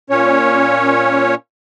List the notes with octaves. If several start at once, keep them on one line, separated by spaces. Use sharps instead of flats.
A#2 C#4 C#5